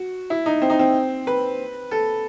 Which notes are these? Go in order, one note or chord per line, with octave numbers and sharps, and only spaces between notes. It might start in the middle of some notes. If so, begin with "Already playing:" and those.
Already playing: F#4
E4
D#4
C4
D#4
C4
B4
A4